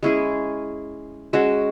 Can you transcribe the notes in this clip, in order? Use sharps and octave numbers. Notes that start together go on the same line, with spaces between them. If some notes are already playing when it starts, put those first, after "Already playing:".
G#3 C#4 E4 G#4
G#3 C#4 F#4 E5